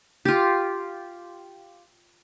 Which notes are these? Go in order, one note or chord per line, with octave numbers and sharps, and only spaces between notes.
F4 G4